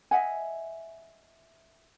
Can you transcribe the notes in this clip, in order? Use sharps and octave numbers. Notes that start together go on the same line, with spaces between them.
D#5 E5 F#5 G#5